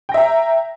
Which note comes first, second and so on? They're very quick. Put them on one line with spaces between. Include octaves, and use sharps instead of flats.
G5 A#6 E5 A#5